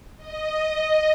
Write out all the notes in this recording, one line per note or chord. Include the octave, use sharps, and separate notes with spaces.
D#5